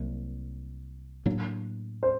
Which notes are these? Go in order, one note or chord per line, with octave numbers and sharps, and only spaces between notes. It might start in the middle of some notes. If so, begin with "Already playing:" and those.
Already playing: C2 C3 F#3 A#3
A2 F#3 A#3 D4
C5